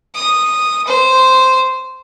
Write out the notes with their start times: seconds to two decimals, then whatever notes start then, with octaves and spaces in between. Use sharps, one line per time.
0.15 D#6
0.87 C5